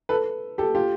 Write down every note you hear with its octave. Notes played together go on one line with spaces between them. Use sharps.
A4 B4
G4 A4
F4 G4